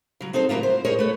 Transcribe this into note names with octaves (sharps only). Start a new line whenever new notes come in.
C#3 F#3
C4 D#4 A4 C5
C#3 F#3 A#3 E4 F4
C5
G#4 A#4 C5 C#5 D#5
A3 B4 C#5